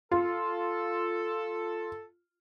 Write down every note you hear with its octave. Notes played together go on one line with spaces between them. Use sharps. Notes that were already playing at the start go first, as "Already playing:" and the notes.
F4 A4